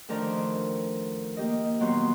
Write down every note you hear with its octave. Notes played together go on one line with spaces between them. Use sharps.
D2 D#3 F3 D4 A#4 D5
A#3 G4 D#5
A#2 D#3 F#3 B3 F#4 C6